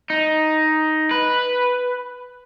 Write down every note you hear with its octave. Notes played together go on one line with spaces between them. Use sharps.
D#4
B4